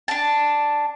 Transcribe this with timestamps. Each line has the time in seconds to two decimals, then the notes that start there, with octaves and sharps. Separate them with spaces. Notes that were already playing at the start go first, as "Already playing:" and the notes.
0.08 D4 A5